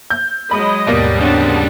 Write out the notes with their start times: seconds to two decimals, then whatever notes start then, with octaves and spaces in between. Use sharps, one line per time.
0.10 G6
0.51 F#3 G#3 D#5 B5
0.87 D#2 G#2 B2 G3 A#3
1.20 C#3 G3 C4 D4 C#5 F#5 A5